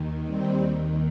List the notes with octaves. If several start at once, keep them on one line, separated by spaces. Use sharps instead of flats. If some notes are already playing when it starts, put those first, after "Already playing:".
Already playing: D#2 D#3
G3 C4